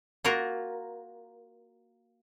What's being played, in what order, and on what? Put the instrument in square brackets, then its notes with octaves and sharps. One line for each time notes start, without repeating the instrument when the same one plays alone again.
[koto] A#3 F4 F#4 A#4